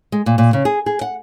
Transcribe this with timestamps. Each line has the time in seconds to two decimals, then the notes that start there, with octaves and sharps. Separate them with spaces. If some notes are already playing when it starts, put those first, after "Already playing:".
0.12 G#3
0.26 A#2
0.38 A#2
0.53 C#3
0.65 G#4
0.86 G#4
1.01 F#5